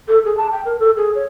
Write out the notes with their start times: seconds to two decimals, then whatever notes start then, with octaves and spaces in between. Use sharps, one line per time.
0.08 A4
0.25 G#4
0.37 A5
0.52 G5
0.65 A#4
0.79 A4
0.96 G#4
1.15 C#5